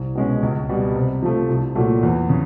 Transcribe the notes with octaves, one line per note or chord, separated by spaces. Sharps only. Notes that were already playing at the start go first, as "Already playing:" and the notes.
Already playing: C2
B2 G#3 C#4
C#2
B2 G3
C3
F3 A3
C2
A#2 F#3 A3
E2
C#3